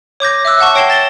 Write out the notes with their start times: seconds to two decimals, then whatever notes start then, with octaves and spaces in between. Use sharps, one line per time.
0.20 C#5 D6 G6 A#6
0.45 E5 D6 E6 F#6
0.60 F#5 A5 C#6
0.75 C#5 G5 A#6 C7 E7 G7
0.90 A6 E7 G7